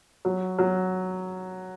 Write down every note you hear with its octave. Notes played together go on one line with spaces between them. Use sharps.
F#3
F#3